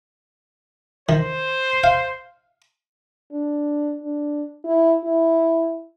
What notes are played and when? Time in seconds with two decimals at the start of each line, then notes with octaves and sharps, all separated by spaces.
1.09 D#3 C5
1.84 F5
3.32 D4
4.03 D4
4.65 E4
5.05 E4